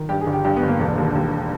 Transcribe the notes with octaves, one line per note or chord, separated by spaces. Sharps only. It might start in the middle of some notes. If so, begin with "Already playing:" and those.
Already playing: D#3
G2 G4
G#4
G1
G4
G2 G4
B3
G1
A#3
E1
D#2
D#2